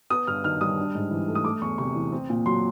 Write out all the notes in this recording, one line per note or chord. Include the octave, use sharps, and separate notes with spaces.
B3 D#6
G2 F6
D#3 F6
G3 D#6
D4
G#2
E3
A3
D#6
A3 D6
E2 C#6
C3 C#6
E3
C4
A#2
F#3 C6